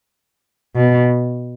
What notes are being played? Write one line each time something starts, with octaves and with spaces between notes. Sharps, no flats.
B2